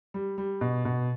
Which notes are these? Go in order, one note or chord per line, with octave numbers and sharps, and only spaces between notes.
G3
G3
B2
B2